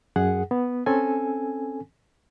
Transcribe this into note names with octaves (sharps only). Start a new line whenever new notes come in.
F#2 G#4 F#5
B3
C4 C#4 A4 G#5